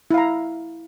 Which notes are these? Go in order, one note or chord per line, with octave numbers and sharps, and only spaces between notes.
E4 F5 A#5